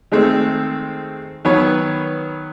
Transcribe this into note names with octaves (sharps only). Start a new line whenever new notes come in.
D#3 G#3 A3 C4
D#3 F#3 B3 B4 C#5